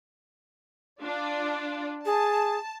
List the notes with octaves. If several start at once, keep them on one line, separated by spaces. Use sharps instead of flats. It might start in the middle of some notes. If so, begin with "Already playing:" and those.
D4 F4 D5
G#4 A5